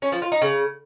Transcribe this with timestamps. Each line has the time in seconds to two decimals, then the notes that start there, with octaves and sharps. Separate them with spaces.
0.02 C#4
0.12 F3
0.22 F4
0.32 D#4
0.42 C#3